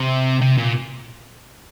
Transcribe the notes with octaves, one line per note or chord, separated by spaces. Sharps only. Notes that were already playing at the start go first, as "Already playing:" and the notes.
Already playing: C3
C3
A#2